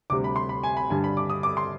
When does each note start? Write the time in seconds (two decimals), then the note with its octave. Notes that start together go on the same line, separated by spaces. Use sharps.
0.10 D2 C3 G3 D6
0.24 B5
0.36 C6
0.49 B5
0.63 G#5
0.77 B5
0.90 G2 D3 G3 G#5
1.04 B5
1.17 D6
1.30 D#6
1.43 D6
1.57 C6